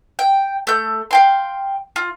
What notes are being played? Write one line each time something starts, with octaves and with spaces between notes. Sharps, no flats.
G5
A3 G6
F5 G5 C6
F4